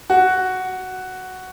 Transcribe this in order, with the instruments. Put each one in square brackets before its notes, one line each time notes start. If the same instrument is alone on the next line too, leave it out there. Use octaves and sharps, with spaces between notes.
[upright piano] F#4